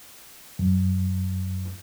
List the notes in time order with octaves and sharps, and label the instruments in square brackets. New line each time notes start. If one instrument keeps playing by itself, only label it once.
[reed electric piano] F#2